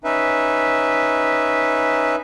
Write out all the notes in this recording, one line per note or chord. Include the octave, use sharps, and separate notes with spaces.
C#4 D#4 B4 E5